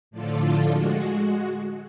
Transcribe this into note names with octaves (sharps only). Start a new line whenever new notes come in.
A2 D3 F3 D4 F4 A4
G#3 F#4